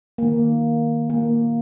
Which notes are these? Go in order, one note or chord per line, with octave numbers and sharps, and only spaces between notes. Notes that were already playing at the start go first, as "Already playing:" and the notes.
D#3 A#3
A#3